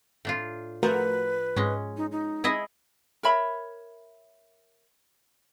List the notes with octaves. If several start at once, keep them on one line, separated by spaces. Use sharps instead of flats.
A2 D4 F4
F3 A3 F#4 A#4 B4
G#2 G#3 C#4
D#4
D#4
E4 G#4 D#5
A#4 C#5 E5 B5